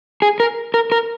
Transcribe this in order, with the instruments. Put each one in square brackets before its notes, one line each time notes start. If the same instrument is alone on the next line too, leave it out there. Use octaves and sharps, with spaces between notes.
[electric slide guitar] G#4
A#4
A#4
A#4